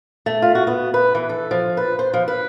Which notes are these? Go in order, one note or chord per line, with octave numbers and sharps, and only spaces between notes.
A3
F4
F#4
B3
B4
E3
A4
F3
B4
C5
F3
B4